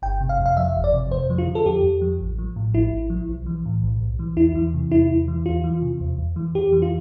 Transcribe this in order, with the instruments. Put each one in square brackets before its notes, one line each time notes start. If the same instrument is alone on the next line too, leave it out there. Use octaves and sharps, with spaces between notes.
[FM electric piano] G1 G5
C3
F5
F2
F5
F3 E5
G1
D5
C3
F2 C5
F3
F4
D3
A4
F2 G4
F2
F3
A1
F3
A2
A1 E4
A1
F3
B1
E3
A2
B1
B1
E3
E2 E4
E3
C3
E2 E4
E2
E3
E2 F4
E3
C3
E2
E2
E3
F2 G4
E3
F4